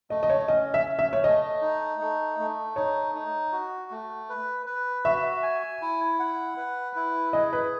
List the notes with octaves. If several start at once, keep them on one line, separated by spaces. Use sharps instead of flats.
A3 D#5
D#5
C#5
C#4 D#5
E5
C#4
E5
C#5
A3 D#5
D#4
A3
A3
D#4 C#5
D#4
F#4
A3
B4
B4
F#4 E5
G#5
E4
F#5
B4
E4
G#4 D#5
B4